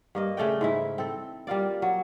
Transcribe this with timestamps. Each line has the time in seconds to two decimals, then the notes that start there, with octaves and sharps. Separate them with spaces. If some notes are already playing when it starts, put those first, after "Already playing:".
0.15 G2 A#3 D#5
0.37 C#3 A3 D5 G5
0.61 G#2 E3 E4
0.98 C4 A4
1.47 G3 A#3 F4 D5
1.82 F#3